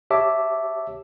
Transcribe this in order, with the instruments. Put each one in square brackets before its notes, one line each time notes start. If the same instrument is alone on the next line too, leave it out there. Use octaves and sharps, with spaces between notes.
[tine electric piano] G4 C#5 E5 A5 D6